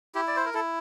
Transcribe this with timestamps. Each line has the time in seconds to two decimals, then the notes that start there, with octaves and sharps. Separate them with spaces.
0.15 E4 G4
0.27 D5
0.36 C5
0.46 A#4
0.54 E4 A4